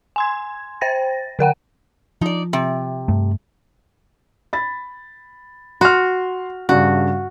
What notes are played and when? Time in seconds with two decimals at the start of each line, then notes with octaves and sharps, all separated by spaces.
0.16 G#5 C6 G#6
0.81 C5 G5 A6 A#6
1.39 D3 A#4 F#5 G5
2.21 F3 D#4 D5
2.53 C3
3.08 G2 A3
4.53 B5 A6
5.81 F#4 C6 F6
6.69 G2 C#3 F#4